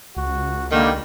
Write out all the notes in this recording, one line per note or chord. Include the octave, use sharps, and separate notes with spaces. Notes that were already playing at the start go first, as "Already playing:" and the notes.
C#2 F#4
D3 D#3 G3 A#3